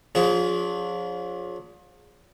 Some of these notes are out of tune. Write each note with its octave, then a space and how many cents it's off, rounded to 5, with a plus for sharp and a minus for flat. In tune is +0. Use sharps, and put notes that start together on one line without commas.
F3 +35 D4 -45 G#4 +0